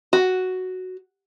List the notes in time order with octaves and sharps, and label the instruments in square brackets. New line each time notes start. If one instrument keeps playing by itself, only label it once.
[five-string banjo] F#4